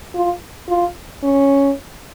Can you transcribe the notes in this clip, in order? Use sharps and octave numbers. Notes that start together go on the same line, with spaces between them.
F4
F4
C#4